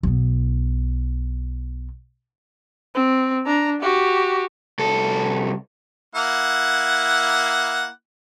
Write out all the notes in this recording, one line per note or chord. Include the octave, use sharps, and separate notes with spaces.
B1 B3
C4
D4 A#5
F#4 G4
C2 A4
A#3 E4 F#5